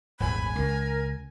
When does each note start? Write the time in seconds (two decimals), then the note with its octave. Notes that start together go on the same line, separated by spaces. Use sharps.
0.20 D#1 G#1 E2 G#5 B5
0.55 C#2 A#4